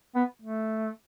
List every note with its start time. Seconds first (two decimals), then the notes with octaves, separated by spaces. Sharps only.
0.15 B3
0.42 A3